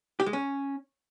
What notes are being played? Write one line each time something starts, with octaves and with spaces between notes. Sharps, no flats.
G4
G#3
C#4